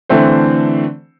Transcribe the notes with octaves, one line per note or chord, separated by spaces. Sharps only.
D3 E3 A3 C4 C5